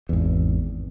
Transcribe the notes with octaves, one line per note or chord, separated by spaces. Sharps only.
G#1 E2